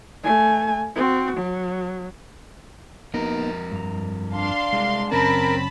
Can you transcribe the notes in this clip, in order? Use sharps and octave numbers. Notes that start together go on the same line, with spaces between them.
A3 G#5
C4 F#4
F#3
F2 A#3 B3 D#4 A#4
G2 A#5
D4 F5 C6
C2 G#3
F#2 C#3 C4 C#4 A#4 A5 B5